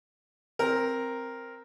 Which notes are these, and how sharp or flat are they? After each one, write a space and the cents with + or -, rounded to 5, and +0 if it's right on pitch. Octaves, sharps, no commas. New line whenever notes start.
C4 +5 A#4 +0